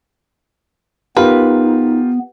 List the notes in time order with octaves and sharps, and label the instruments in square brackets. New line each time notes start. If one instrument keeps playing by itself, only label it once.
[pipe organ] B3 [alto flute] D#4 [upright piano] F4 G4 A#4 [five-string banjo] B4